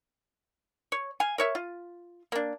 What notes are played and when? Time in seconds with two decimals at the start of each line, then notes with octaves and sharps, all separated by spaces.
0.92 C#5
1.20 F5 G#5
1.38 A#4 C#5 E5
1.55 F4
2.32 A#3 D4